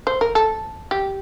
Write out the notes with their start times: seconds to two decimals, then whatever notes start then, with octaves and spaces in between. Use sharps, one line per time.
0.07 C5
0.21 A#4
0.35 A4
0.91 G4